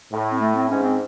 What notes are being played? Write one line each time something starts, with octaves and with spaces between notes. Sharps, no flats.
A2
C4
A3
C4
G#2 C#4
C4